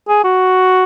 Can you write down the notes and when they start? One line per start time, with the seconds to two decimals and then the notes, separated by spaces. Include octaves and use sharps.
0.08 G#4
0.24 F#4